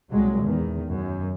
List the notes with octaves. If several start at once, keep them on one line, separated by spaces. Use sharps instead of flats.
C2 A#2 F#3 G#3
E2 D#3
F#2